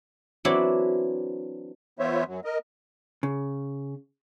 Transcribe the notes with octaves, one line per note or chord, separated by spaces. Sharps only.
E3 F#3 C4 D4 E4
E3 B3 F4 C5 C#5 E5
F#2 F#3
A#4 D#5
C#3